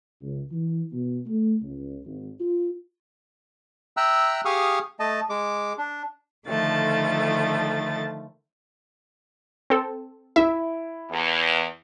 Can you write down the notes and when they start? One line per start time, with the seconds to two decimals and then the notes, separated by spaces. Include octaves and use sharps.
0.21 C#2
0.52 E3
0.93 B2
1.26 A3
1.61 C#2
2.05 G#1
2.40 F4
3.97 E5 G5 A#5 E6 F#6
4.45 G4 G#4 F5 C#6 D#6 F6
5.00 A3 D#5 A5
5.30 G#3 D6
5.78 D4
6.47 D3 D#3 F3 A3 A6
9.70 C4 A4
10.36 E4 E5
11.11 E2